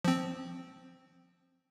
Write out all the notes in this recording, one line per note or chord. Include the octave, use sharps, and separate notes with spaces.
F3 C4